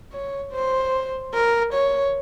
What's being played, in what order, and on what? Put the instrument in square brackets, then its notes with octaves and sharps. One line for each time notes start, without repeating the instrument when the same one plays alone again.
[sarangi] C#5
C5
A#4
C#5